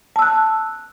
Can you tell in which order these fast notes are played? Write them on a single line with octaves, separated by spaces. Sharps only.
A5 E6 F#6